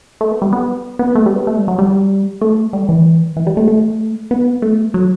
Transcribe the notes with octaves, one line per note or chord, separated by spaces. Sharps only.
A3
B3
G3
B3
B3
A3
G3
B3
A3
G3
F#3
G3
A3
G3
E3
E3
G3
A3
A3
B3
A3
F#3